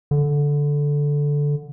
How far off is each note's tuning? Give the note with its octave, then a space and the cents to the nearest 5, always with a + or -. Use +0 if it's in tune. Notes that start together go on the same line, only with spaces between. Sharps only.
D3 -10